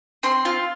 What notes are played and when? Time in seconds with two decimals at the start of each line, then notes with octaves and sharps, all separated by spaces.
0.23 C4 C6
0.45 F4